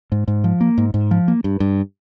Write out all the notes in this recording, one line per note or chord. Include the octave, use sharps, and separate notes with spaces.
G#2
G#2
F3
A#3
G#2
G#2
F3
A#3
G2
G2